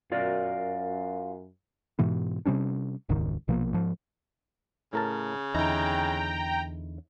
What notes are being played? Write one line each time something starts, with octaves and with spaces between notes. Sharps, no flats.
F#2 F4 F#4 A#4 D5
G#2 B2 E3 B3
C3 G3 C#4 D4
E1 C#2 G#2 D#3
A#1 B2 F3 A#3
G#2 F3
A2 C#3 A#4 A5
E2 D3 D#4 E4 G5 A#5